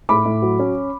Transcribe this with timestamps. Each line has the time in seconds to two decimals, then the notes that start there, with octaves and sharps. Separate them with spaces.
0.09 A2 B5 D6
0.25 A2
0.42 F#3
0.59 C#4